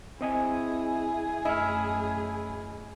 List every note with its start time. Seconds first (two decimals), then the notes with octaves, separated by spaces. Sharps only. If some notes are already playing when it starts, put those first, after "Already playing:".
0.21 C4 E4 G#4 D#5 G#5
1.45 F#2 A3 E4 D#5 F6